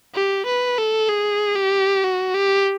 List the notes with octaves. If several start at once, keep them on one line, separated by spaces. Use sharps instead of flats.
G4
B4
A4
G#4
G4
F#4
G4